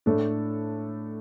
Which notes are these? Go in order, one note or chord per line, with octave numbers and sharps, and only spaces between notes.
A2 A3 D4 A4